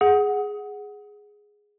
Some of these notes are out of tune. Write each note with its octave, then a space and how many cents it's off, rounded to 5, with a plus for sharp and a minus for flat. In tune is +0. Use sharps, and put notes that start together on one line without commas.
G#4 +0 F#5 +0